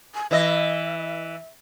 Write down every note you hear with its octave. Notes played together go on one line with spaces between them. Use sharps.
G#5
E3 D#5 E5